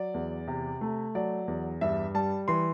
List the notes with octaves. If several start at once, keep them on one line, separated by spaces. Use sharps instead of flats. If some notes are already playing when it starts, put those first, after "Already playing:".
Already playing: F#3 D5
E2
C3
A3
F#3 D5
E2
G2 E5
G3 A5
E3 C6